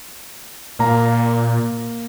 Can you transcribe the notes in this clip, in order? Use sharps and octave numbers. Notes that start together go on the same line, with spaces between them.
A#2 A#3 A#5